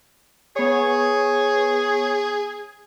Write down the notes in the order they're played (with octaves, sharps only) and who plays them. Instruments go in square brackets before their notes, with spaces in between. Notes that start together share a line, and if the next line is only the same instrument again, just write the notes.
[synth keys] B3 C#5 [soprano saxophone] G#4